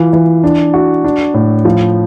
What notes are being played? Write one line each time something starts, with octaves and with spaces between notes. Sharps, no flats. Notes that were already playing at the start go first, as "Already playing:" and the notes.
Already playing: E3 F4
E3
D4
F#4
D4
A2
F3